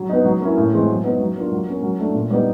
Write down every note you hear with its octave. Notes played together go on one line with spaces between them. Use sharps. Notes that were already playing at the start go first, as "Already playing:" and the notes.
Already playing: F#3
B3 D#4
F#3
A#3 C#4 E4
A2
E3 G#3 C4
F#3
B3 D#4
F#3
A#3 D4 F4
F#3
A#3 C#4
F#3
A3 D4
A#2
G3 B3 D#4